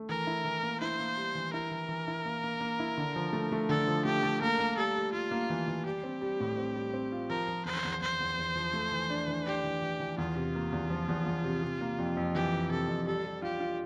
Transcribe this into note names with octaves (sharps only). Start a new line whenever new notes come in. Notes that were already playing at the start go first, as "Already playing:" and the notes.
Already playing: A3
E3 A#4
E4
E3
A#3
E4 C5
A#3
G3
E3
E4 A#4
E3
E3
E4
A#3
A#3
A#3
E4
D3
F3
A3
A3
D3 A4
F3
A3 G4
A3
A#3 A#4
A#3
G3 A4
G3
G3 F4
A#3
E3
E3
G3 G4
C4
G3
A2
C4
G3
C4
F4
F3 A#4
F3
E2 C5
E2
E2 C5
E2
E2
F3
A3
E3
D4
E3
D4 G4
E3
E3
E3
E2 F4
C3
A#3
E2
F3
E2
E2
C3
C3
A#3
F2
F2
E3 G4
E3
C3 A4
F2
G3 A4
G3
F4 G4
F4